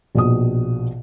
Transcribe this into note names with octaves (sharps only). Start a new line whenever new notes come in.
A#1 B2 D#6